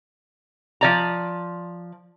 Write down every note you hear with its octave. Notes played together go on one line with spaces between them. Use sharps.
F3 D5 A#5